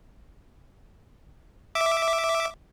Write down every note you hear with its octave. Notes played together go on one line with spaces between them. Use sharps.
E5 D6